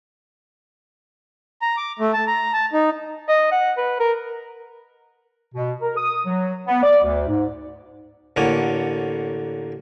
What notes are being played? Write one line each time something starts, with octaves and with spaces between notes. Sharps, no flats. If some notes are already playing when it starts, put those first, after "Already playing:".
A#5
D6
A3
A5
A#5
A5
D#4
D#5
F#5
B4
A#4
B2
A#4
D#6
F#3
B3
D5
D2
G#2
A1 D3 A#3 C#5 F#5 G#5